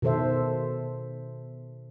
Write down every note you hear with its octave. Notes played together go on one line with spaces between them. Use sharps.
B2 D#3 A4 C5 E5